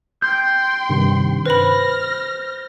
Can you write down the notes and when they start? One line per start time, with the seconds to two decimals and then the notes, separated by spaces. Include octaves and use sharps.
0.22 G5 C6 G6
0.89 G2 C3 D#3
1.46 B4 C5 B5 F6 A#6